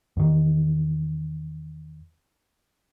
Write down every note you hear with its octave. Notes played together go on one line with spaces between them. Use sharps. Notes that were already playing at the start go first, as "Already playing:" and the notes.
E2 D#3